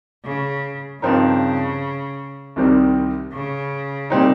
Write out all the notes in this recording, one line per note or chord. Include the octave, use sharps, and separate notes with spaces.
C#3
G2 C#3 F3 C4 D#4 A#4
C2 C3 D#3 G3 C4
C#3
A#2 G3 C4 D#4